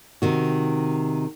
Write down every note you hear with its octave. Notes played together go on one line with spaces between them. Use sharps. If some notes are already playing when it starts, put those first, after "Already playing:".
C3 D#3 F#4